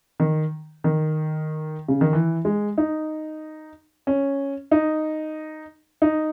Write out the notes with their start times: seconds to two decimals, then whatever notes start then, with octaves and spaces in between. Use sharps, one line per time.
0.20 D#3
0.84 D#3
1.88 C#3
2.01 D#3
2.13 E3
2.45 G#3
2.78 D#4
4.07 C#4
4.71 D#4
6.02 D#4